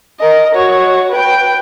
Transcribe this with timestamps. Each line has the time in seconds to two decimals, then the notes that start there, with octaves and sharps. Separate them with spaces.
0.20 A#4 D#5
0.54 F#4 C#5
1.12 B4 G5